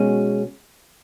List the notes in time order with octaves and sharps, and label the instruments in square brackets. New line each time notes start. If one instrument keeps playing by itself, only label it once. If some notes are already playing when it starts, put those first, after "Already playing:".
Already playing: [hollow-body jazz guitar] B2 G#3 C#4 F#4